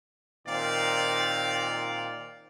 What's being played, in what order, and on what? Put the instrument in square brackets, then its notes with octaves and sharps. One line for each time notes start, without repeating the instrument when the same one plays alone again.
[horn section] A#2 D#3 C4 D5 F5